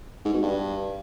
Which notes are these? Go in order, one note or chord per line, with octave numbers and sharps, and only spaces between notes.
G#2
B2
G2